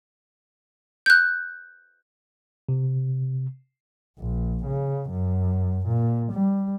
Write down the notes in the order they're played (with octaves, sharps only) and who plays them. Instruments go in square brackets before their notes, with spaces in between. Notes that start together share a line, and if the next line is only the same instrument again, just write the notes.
[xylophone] F#6 G6
[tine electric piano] C3
[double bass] A#1
C#3
F#2
A#2
G3